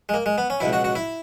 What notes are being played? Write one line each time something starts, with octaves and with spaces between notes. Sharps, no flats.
G#3
A#3
G#3
B3
C#4
C#2 B2 E4
F#4
F#4
E4